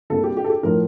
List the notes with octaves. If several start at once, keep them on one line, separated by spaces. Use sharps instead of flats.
C2 C3 G3 A#3 A4
G4
G4
A4
G4
A2 F3 A#4